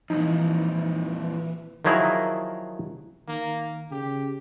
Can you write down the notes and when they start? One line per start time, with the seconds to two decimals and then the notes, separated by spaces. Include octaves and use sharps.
0.10 F2 A#2 E3 D#4
1.85 D#3 F3 F#3 E4 G#4 A#4
3.28 D#3 A#3
3.92 C#3 G4